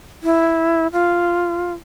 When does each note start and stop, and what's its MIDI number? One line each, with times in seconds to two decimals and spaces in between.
0.23 0.87 64
0.93 1.73 65